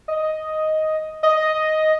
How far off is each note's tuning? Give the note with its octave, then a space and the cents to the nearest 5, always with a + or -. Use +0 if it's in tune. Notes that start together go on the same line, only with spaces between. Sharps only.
D#5 +5
D#5 +5